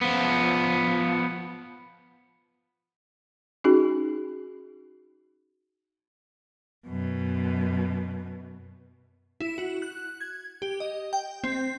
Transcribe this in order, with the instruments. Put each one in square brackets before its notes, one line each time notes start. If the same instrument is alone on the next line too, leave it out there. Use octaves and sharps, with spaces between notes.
[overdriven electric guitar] F3 B3
[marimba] C#4 D#4 F#4 G#4
[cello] F#2 B2
[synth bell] E4
F#4
F#6
G#6
G4
D#5
G5
C4